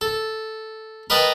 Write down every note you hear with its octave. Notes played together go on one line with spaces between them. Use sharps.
A4
A#4 B4 D#5 G5 A5